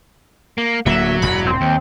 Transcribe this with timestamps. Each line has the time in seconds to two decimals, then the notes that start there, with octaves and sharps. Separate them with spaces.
0.58 A#3
0.86 D1 D3 F#3 A#3 E5
1.22 E1 G2 A#2 B5
1.47 C4
1.61 D#2